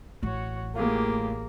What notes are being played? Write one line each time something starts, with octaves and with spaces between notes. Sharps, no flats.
A1 F#4 C#5
A2 A#3 F4 G4 G#4